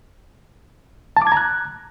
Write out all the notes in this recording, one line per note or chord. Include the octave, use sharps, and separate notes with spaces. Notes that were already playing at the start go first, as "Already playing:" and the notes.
A5
D6
G#6
A#5
F#6